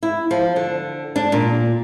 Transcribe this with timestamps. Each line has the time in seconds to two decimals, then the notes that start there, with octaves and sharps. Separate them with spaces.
0.03 E4
0.31 F3
0.56 D3
1.16 D4
1.32 A#2